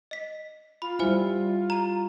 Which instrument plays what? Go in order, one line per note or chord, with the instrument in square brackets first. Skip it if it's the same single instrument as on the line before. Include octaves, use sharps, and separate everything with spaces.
[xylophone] D#5 B6
[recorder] F4 [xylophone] B5
[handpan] G3 E4 [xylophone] C5 G#5 F6
[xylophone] A#5 D#7